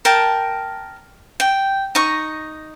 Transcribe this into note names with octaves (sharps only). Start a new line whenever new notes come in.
A#4 G5 A5
G5
D#4 D#5 C#6